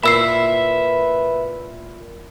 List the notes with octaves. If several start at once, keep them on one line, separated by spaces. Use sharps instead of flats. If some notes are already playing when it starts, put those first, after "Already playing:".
A#2 E4 B4 E5 B5 E6 C7